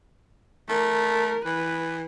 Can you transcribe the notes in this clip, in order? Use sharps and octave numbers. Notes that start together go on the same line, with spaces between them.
A3 A#4
E3 B4